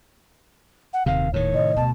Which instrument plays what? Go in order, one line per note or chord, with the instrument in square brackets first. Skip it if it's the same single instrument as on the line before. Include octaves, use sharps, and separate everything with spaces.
[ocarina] F#5
[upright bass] D#1 [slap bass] C3 D#3 [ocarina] F5
[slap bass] A2 D#3 [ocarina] C#5
[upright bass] C3 [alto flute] D#5
[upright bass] D2 B2 [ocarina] A5